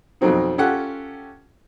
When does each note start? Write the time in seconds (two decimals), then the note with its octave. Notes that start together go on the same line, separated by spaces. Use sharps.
0.21 F2 B2 D#3 F#3 C4 D#4
0.58 C#4 F4 G4 A4 F#5